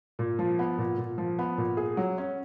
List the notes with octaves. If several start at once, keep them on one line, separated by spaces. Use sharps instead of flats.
A#2
F3
B3
A#2
A#2
F3
B3
A#2
G#4
F#3
C#4